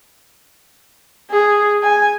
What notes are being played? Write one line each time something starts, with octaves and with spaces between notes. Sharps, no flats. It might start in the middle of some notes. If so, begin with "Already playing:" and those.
G#4
G#5